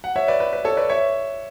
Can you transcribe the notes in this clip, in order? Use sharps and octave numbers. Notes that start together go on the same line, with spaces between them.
F#5
C#5 E5
B4 D5
B4
B4
A4 C#5
B4 D5
C#5 E5